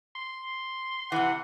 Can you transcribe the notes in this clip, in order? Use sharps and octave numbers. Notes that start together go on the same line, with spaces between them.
C6
C3 E3 F#5